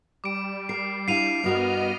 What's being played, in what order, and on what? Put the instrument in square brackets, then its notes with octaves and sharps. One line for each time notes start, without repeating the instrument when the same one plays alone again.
[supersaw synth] G3 [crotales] D6 D7
[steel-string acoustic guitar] A#4 [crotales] C7
[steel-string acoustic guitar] D4 E4 F5 [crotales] C7 D#7 F7
[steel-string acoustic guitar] G2 F#4 A#4 [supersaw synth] B3 D#5 F6